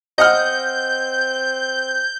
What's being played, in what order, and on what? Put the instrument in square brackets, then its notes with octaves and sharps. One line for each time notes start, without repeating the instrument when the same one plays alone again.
[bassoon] C4 [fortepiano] D#5 F#5 F6 [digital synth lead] G6